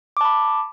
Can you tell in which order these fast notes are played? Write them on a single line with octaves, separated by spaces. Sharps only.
D6 A5 B5